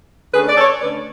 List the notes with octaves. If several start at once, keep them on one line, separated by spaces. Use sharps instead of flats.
D3 A3 C#4 G#4 B4
D5
A4 C#5
D3 A3 C#4 B4 D5